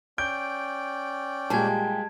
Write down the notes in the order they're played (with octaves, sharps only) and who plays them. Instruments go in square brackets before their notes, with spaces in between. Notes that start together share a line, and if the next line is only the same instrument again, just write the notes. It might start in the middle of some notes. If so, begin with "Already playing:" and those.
[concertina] C#4 D5 G5 [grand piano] G6 [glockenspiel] D7
[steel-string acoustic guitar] A#2 G4 G#5 [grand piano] G3 G#3 [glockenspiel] A5 G#6